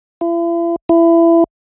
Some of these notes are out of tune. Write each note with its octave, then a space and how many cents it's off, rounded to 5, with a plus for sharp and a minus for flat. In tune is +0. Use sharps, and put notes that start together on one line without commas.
E4 +45
E4 +25